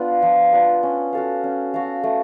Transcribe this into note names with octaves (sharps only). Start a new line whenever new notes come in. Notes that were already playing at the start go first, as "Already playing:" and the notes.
Already playing: B3 D4 F4
F3
B3 D4 F4
C#4
F#4 A4 F5
C#4
F#4 A4 F5
A3